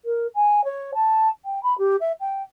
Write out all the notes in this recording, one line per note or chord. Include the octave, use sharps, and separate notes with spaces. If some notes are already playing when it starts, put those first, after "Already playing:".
A#4
G#5
C#5
A5
G5
B5
G4
E5
G5